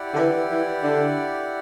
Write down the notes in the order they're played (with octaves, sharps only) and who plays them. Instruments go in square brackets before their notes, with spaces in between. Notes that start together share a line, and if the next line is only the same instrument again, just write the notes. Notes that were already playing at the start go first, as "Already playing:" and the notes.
Already playing: [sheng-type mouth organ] E4 G4 D5 F#5
[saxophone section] D3
E3
E3
D3